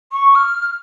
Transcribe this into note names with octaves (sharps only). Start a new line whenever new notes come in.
C#6
F6